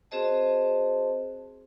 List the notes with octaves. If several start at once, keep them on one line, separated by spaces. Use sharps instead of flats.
C4 F#4 G#4 C5 D#5 A5